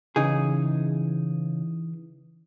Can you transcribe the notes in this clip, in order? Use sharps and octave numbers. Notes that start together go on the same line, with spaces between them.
C#3 E3 D#4 G#4